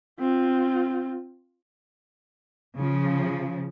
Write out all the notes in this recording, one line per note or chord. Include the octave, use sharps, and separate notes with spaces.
C4 F4
C#3 F3